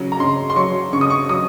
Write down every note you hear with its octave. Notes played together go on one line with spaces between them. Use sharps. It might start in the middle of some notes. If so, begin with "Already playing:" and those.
Already playing: C#3 F#3
A#5
C#3 C6
C6
F#3 C#6
C#3 C#6
D#6
C#6
F#3 D#6